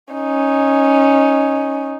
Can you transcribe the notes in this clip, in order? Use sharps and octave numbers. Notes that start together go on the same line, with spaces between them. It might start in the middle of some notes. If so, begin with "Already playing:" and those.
C#4 D#4